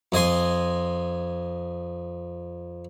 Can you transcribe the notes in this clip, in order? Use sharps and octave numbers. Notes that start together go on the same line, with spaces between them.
F2 D#5 G#5 C6